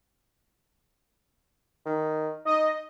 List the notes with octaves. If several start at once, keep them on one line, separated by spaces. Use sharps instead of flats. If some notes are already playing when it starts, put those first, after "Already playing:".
D#3
D#4 D#5